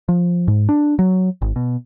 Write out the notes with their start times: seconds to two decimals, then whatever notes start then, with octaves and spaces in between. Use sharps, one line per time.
0.09 F3
0.48 G#2
0.69 D4
0.99 F#3
1.42 G#1
1.56 B2